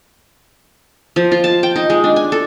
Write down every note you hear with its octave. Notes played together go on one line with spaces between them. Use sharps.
F3
F4
A5
G5
D#4
G#3
D4
G#5
A4